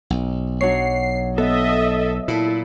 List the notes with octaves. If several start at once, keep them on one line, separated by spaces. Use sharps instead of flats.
B1
F#3 D4 C#5 C7
B3 A4 D#5 E5
A#2 E4 A4